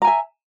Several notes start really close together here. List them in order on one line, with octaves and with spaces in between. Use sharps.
A#5 G#5 E5